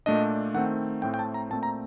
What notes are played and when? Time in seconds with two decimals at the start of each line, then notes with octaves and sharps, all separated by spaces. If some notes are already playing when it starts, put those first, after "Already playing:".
0.06 A#2 A3 D4 D#5
0.54 D#3 A3 C4 F#5
1.02 A2 A3 C4 G5
1.14 G5
1.19 A5
1.34 A#5
1.50 A#2 A3 C4 A5
1.63 A#5